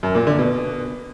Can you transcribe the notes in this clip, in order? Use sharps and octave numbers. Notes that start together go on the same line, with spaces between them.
F#2
A#2
D3
B2